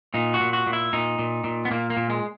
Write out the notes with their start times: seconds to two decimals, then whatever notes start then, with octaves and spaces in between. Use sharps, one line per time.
0.14 A#2 D#4
0.34 F#4
0.40 A#2
0.53 F#4
0.67 A#2
0.73 E4
0.93 A#2 D#4
1.19 A#2
1.44 A#2
1.65 B3
1.71 A#2 A#3
1.90 A#3
1.97 A#2
2.10 G#3